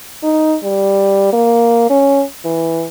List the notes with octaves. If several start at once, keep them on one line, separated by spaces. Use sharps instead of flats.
D#4
G3
A#3
C#4
E3